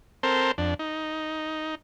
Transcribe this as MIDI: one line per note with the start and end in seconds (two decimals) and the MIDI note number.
0.23 0.52 60
0.23 0.52 69
0.23 0.52 70
0.23 0.52 72
0.58 0.74 41
0.58 0.74 62
0.79 1.75 63